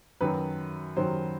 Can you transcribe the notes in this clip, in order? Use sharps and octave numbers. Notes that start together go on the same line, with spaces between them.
F#2 D#3 F#3 B4
F#2 D#3 F#3 C5